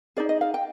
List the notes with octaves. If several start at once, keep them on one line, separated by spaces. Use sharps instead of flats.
D#4 G#4 D5
D#5
F5
G5